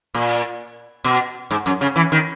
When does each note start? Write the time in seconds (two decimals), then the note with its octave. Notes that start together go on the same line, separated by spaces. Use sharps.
0.14 A#2
1.04 B2
1.51 G#2
1.66 F#2
1.81 C#3
1.96 E3
2.12 D#3